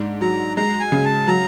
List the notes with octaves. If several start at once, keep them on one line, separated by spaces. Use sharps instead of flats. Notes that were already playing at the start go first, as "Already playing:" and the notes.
Already playing: G#2 D4
F#3 A#5
G#3 A#5
G#5
C#3
A5
F#3 A#5